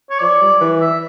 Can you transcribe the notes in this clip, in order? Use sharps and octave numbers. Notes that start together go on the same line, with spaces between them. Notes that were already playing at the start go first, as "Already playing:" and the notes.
C#5
F3 D5
G3
E3
E5